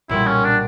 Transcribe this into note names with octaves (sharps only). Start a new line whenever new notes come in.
B1 A#2 G3 E4
C#4
D4